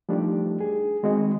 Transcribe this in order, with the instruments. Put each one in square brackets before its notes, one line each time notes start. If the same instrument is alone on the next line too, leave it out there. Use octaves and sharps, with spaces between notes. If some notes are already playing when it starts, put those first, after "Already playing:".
[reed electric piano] F3 G3 A3 D4 D#4 G4
G#4
D#3 G#3 C4 F#4 D#5